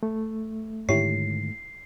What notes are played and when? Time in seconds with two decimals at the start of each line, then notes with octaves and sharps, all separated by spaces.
0.03 A3
0.89 G#2 D3 D#3 E4 G4 C#5 C7